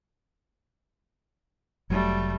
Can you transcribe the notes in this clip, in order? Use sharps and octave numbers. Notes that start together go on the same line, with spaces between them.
F1 F#3 G3 A3